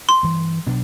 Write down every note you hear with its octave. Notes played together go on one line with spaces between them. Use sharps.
C6
G2 E3 G3
B2 F#3 B3 D4